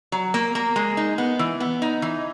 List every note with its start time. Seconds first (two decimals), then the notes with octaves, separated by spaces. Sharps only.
0.12 F#3
0.34 A#3
0.55 A#3
0.76 G#3
0.97 D#4
1.18 B3
1.39 E3
1.60 B3
1.82 D#4
2.02 E3